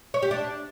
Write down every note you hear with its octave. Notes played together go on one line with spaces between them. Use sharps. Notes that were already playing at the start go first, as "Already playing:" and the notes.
C#5
G4
D4